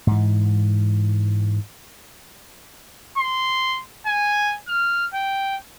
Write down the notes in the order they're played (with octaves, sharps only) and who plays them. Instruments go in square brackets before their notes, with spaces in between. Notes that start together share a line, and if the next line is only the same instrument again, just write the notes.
[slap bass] G#2 E3
[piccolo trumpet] C6
G#5
F6
G5